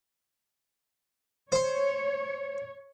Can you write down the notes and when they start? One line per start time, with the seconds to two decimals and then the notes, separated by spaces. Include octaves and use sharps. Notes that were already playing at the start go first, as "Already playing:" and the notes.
1.52 C5 C#5 C6